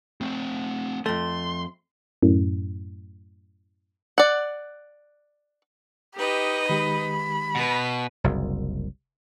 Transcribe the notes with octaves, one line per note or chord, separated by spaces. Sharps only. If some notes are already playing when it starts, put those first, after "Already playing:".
A3 C4
F2 A3 C6
F#2 A2
D5 F#5
D#4 G4 B4 D#5
D#3 G#3 G4 B5
B2 B4
F#1 C2